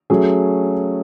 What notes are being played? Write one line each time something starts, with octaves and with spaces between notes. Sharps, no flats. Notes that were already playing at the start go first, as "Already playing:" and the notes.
F#3 A3 C#4 G#4